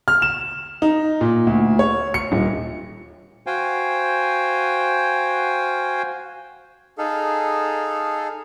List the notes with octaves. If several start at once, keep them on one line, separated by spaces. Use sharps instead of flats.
F6
E7
D#4
A#2
D2
C#5
C#7
D#1
F#4 C5 F5 G5 G#5
D#4 G#4 A4 F5